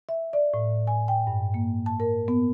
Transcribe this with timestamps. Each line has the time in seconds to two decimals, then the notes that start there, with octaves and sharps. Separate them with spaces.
0.09 E5
0.33 D5
0.54 A2
0.87 G#5
1.08 G5
1.27 G2
1.54 A#3
1.86 A5
2.00 A#4
2.28 B3